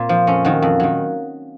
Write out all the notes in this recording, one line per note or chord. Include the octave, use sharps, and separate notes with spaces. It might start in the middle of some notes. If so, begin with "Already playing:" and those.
Already playing: A#2 A#3 C4
F3
F2 C#4
D#3 F#3
F2
D#3 F#3